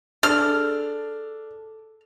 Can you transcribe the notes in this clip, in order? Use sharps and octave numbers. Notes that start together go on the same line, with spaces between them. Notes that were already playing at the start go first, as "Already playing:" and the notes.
D4 G#4 A4 F6